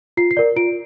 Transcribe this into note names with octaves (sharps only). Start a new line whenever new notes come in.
F4 C7
C7
A#4 D5
F4 D7